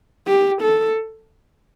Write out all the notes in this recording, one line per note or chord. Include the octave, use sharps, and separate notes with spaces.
G4
A4